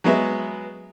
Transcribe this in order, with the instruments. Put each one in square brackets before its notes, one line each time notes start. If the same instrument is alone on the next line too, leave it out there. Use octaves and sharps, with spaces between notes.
[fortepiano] F#3 G#3 B3 E5